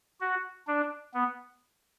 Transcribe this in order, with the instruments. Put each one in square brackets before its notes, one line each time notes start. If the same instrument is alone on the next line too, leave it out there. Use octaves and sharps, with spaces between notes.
[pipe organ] F#4
D4
B3